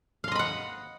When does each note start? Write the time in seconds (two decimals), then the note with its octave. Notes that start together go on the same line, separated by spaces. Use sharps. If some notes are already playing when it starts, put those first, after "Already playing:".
0.24 F5
0.28 C6
0.32 D#5
0.35 B5
0.39 F#5